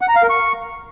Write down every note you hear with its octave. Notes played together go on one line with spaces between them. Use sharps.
F#5
A#5
F5
A#4
C#6